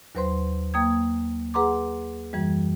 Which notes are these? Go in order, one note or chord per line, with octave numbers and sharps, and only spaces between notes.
D#2 F#3 B4 C5 C6
A#3 G5 D#6 G#6
G#4 B4 F#5 A#5 C6 D6
F#2 E3 G3